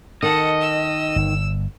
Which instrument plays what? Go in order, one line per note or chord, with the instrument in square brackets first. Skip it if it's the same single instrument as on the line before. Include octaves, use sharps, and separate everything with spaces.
[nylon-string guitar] D#3 [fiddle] A4 F#5 [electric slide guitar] D#5
[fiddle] E6
[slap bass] G1